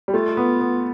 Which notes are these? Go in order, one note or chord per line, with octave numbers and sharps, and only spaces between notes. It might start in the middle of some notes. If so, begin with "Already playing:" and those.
G3
A3 F4
B3
B3